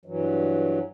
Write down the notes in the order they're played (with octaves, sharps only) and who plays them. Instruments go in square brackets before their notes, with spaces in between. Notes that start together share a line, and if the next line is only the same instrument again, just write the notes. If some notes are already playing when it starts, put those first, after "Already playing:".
[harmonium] G2 E3 F#3